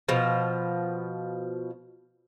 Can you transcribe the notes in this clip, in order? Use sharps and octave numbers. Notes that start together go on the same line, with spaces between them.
B2 F3